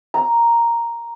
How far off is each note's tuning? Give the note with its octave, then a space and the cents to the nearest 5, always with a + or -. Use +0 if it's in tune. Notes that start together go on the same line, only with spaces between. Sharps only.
A#5 +0